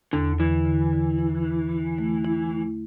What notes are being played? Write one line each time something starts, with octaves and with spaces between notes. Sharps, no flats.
E2 D3
D3 E3
D3
D3
E4
E4
D3
A3
E4
A3